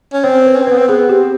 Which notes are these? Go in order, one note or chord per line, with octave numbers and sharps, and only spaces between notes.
C#4
C4 C#5
B4
C#4
C4
B3 B4
C4
B3 G#4
C4 G4